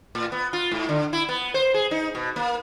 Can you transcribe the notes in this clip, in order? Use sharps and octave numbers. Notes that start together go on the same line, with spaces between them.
A2
B3
F4
G#2
D3
E4
B3
C5
G#4
D#4
B2
A#3